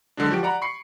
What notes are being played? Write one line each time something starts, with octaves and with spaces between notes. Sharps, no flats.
D3 F#3 G#3 D4
F3 F#4 G4 D7
D5 F#5 A#5 B5
B5 C#6 C7 C#7